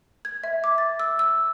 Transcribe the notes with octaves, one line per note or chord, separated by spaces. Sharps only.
G#6
E5
D6
A6
E6
E6